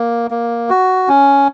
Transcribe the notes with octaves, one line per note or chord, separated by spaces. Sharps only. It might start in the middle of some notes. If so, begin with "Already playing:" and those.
Already playing: A#3
A#3
F#4
C#4